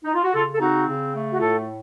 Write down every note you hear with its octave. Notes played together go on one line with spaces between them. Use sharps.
D#4
F4
F#4
C#3 F4 A4
A4
C4 D#4 F#4
C#3
A3
F#4
A2 F4 A4